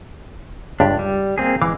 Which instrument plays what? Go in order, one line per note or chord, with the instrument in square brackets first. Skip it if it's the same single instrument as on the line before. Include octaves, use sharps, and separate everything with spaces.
[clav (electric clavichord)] C#2 G2 G4 [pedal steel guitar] D4
[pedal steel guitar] G3
A#3 C4 G#4
[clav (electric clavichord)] E3 F5 [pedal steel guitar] G#3 D6